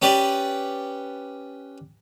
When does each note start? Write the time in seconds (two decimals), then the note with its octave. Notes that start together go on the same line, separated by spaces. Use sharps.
0.02 C#4 G4 B4 D5